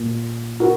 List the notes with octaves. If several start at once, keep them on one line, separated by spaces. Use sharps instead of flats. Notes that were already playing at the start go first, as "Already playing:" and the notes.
Already playing: A#2
F#4 A#4